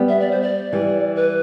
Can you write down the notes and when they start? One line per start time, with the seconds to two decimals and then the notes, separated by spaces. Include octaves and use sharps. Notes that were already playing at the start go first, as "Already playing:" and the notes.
Already playing: G3 B3
0.08 E5
0.20 D5
0.31 C5
0.42 D5
0.73 E3 G3
1.16 B4